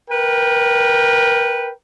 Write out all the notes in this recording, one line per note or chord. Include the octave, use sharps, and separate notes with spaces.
A#4 B4 G5